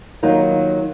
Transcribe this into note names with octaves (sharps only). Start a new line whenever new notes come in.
D#3 F#3 A#3 D#4 F4